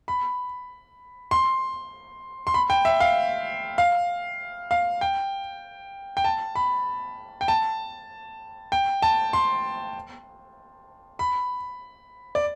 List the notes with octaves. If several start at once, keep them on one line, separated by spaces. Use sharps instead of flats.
B5
C6
C6
B5
G5
E5
F5
F5
F5
G5
G5
A5
B5
G5
A5
G5
A5
C6
B5
D5